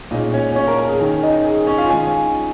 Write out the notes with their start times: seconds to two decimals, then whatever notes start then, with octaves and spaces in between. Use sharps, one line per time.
0.11 A#2 G#3 C#4 D#4 D#5
0.34 C#4 C#5
0.56 C#4 C#5
0.68 A#4
0.78 A#4
0.89 G#4
1.00 D#3 C#4 A#4
1.23 D#4 D#5
1.45 G#4
1.67 C#4 C#5
1.78 F4 F5
1.90 D#3 G#3 C#4 G#4 G#5